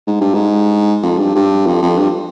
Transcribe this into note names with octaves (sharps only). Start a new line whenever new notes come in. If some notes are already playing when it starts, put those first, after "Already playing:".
G#2
G2
G#2
F2
G2
G2
F2
F2
G2